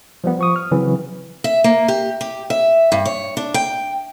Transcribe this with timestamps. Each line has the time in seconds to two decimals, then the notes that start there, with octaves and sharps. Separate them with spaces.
0.24 F3 G3 B3
0.39 F3 C#6 D#6
0.56 F6
0.71 C#3 E3 F#3 C4
1.44 E5
1.64 A#3
1.88 G4
2.21 G4
2.50 E5
2.92 G2
3.05 C#5
3.37 D4
3.54 G5